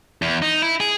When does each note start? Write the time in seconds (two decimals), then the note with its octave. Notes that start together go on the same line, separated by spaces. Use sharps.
0.22 E2
0.42 D#4
0.62 E4
0.80 G#4